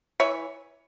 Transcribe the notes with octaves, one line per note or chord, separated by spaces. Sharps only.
E3 C#5 E5